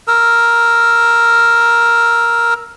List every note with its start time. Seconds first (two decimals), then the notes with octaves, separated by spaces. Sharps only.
0.08 A#4 E6